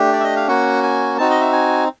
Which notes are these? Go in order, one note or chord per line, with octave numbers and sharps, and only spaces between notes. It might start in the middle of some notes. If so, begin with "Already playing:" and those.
Already playing: A3 D4 G4
D5
E5
D#5
F5
A#3 C#4 F#4 F#5
G#5
C4 D#4 F#4 A5
D#5
E5
G#5